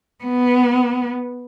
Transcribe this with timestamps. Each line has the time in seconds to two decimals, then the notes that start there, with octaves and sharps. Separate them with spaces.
0.24 B3